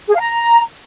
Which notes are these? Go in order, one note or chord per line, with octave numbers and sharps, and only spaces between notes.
G#4
F5
A#5